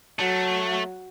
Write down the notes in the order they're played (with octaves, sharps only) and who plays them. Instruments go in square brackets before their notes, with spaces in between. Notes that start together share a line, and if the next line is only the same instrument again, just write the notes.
[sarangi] F#3 [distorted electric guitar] A3